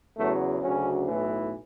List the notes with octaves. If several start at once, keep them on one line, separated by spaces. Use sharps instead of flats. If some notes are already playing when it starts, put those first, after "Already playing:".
E2 C#3 F#3 A3
D2 C#3 F#3 C#4
B1 A2 E3